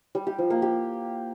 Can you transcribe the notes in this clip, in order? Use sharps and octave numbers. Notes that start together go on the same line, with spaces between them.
G3
G4
F3
A#3
G4